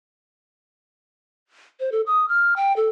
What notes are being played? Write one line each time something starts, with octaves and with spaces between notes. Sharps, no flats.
C5
A4
D#6
F6
G5
A4